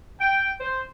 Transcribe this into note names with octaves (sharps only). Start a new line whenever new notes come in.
G5
C5